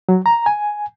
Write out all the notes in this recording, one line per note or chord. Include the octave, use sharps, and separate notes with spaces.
F#3
A#5
G#5